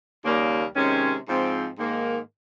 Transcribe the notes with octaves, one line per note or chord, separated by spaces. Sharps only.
D#2 C#3 G3 A#3
C3 D#3 G#3 C#4
G#2 F3 C4
G#2 D#3 A#3